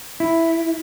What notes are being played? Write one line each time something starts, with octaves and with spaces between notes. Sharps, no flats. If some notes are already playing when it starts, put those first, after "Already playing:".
E4